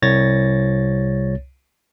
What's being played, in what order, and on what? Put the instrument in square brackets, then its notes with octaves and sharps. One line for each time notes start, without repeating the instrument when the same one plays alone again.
[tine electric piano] C2 C#5 A6 A#6